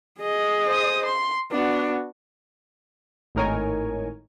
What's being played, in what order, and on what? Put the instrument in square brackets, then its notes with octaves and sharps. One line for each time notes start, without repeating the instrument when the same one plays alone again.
[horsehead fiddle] G#4 D#5
[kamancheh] C5 D#6
C6
[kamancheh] B3 F#4 [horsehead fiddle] D4
[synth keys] G#1 A2 D#4 A#4 C#5 G#5